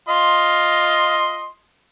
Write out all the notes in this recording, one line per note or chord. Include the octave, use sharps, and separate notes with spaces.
F4 D#5 C6